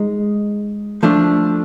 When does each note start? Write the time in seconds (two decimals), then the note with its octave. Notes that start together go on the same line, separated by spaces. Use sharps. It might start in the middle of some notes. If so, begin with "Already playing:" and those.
Already playing: G#3 D#4
1.03 F3 A3 D4